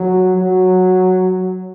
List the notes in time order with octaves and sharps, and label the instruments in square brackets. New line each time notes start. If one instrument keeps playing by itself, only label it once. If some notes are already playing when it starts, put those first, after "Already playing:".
Already playing: [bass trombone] F#3
F#3